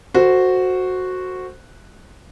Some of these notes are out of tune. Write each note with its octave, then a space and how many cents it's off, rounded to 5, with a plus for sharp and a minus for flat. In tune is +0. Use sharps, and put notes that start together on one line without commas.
F#4 -5 A4 +35 C5 +0